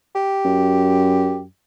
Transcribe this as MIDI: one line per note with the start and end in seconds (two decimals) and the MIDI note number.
0.15 1.41 67
0.44 1.45 42